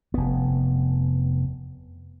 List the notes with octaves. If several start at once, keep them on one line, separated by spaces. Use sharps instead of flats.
F1 B3